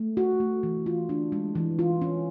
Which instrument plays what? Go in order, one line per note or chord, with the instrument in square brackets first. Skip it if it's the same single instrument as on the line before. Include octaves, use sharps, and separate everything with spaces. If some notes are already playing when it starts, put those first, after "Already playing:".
Already playing: [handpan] A3
F#4
A3
E3
F4
D4
G#3
E3
F4
C#4